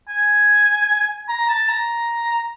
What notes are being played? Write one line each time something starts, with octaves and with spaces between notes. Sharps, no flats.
G#5
A#5
A5
A#5